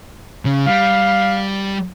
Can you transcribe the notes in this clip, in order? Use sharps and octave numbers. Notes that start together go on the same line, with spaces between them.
C#3
G3 F5